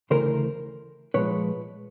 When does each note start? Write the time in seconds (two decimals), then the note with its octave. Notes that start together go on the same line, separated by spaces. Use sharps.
0.10 D2 C#3 E3 A3 A#4 C5
1.14 A#2 F3 G#3 B4 C#5